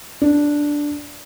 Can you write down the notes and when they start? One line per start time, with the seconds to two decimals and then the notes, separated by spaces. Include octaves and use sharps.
0.22 D4